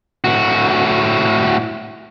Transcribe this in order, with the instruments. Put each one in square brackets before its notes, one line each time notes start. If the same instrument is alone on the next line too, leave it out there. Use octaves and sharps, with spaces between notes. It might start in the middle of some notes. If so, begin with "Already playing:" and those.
[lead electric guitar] A2 F#4